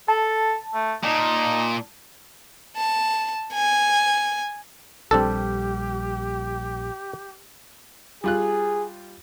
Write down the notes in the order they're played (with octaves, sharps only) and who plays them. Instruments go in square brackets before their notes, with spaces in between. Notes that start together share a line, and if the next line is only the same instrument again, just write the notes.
[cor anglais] A4 [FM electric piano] A5
[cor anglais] A3
[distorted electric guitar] A#2 [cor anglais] D#4
[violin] A5
G#5
[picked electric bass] A#1 G3 [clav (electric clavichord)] C4 D4 A4 [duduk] G4
[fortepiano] G3 F4 F#6 [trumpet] G#4